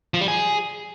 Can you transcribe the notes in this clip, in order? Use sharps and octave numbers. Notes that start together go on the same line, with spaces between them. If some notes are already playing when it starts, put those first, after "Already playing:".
F3
G3
G#4